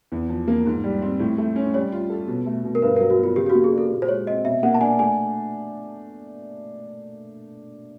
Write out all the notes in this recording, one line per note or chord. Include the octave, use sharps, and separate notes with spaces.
E2
F3
A#3
G#2
G3
C4
A2
A3
C#4
G3 C#5
F4
A4
B2
A3
B2
A#4
G2 B4
A#4
F#3
F#4
B3 F4
C#3 G4
G4
F#4
A#3
G#4
D4
A4
A#2
C5
G#3 C#5
C4 D#5
B2 E5
A#3 F#5
A5
D4 G#5
A3 G#5